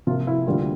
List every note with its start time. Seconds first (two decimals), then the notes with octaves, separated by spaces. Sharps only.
0.07 C3 F3 A#3 F4
0.27 E4
0.46 D2 D3 G3 A#3 F4